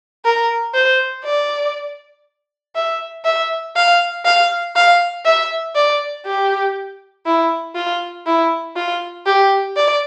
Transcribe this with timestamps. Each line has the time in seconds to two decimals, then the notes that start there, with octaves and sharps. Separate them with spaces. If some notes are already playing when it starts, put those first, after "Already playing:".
0.25 A#4
0.74 C5
1.25 D5
2.75 E5
3.25 E5
3.76 F5
4.25 F5
4.76 F5
5.25 E5
5.76 D5
6.26 G4
7.26 E4
7.75 F4
8.27 E4
8.76 F4
9.26 G4
9.76 D5